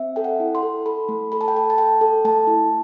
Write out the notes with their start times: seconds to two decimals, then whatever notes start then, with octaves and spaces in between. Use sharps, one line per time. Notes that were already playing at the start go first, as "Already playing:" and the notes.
Already playing: C4 E5
0.16 A4 G5
0.24 F#5
0.40 E4
0.55 C6
0.62 A4
0.86 A4 B5
1.09 A3
1.32 A4 B5
1.41 A5
1.48 G5
1.55 A4 A5
1.70 A5
1.78 A4 G5
2.01 A4
2.25 A3 A5
2.47 E4